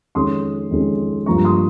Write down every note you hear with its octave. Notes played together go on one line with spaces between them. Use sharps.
F2 D#3 G#3 C#4 C6 D#6
F2 D#3 G#3 C#4
G2 F3 A#3 A#5 C#6
C6 D#6